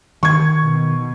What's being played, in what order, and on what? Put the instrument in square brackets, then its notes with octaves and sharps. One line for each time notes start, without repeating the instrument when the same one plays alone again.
[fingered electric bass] D#3 [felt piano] C#6 G#6
[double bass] B2